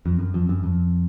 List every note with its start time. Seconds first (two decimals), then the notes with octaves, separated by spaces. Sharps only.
0.06 F2
0.19 F#2
0.34 F2
0.49 F#2
0.64 F2